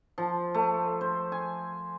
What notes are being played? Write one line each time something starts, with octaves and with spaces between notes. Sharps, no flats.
F3
A3
C5
G#5